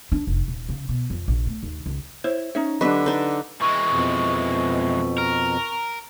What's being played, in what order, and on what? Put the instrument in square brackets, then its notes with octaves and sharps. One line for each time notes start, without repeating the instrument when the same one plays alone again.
[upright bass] D4
F1
D#1
C#3
B2
F2
A#1
A3
D#2
C#2
[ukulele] E4 [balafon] C5 C#5
[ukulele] C#4 D#4 C#5 [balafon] E5
[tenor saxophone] D3 [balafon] F#3 G4 [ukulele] D4 D#4 D#5 [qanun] B4 E5
[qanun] D4 D#4 [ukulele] B4
[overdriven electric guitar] E3 G#3 [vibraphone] C#6
[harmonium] F2 B2
[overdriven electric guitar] A#4